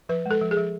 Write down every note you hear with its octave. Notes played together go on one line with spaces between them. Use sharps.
F3 B4
G#3 A4
F3
G#4
F3